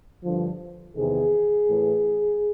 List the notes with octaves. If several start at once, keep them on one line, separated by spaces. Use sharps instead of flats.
G2 D3 F3
E2 C3 D#3 G#4
A2 E3